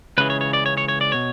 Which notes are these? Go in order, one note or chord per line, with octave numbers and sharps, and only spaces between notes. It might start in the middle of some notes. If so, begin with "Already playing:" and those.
C#2 C#3 E3 B4
C#5
C#5
D5
C#5
C#5
C#5
D5
B2 C#5